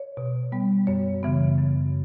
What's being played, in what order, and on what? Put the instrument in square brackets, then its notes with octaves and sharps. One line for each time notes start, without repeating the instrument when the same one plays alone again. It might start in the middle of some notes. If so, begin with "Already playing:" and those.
Already playing: [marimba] C#5
B2
G3 B3
F#2 C#5
C#3 E3 B3
F#2